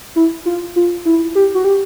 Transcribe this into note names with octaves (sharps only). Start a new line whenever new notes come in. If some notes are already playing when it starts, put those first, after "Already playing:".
E4
F4
F4
E4
G4
F#4
G4